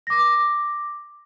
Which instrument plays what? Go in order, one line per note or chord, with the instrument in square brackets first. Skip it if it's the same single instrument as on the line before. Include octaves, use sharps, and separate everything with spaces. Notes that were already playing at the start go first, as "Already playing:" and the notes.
[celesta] D6 A#6